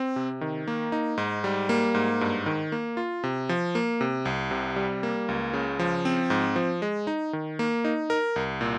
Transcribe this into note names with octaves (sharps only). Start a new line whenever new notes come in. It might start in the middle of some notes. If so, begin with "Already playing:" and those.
Already playing: C4
C3
D#3
A#3
D#4
G#2
G3
A#3
G#2
G2
D#3
A#3
F4
C3
F3
A#3
C3
C2
C3
G3
A#3
C#2
C#3
F3
C4
G#2
F3
G#3
D#4
D#3
A#3
D#4
A#4
C2
A#2